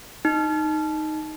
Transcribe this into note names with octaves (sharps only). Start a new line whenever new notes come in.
D#4